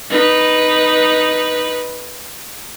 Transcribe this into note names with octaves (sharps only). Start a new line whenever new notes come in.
D#4 B4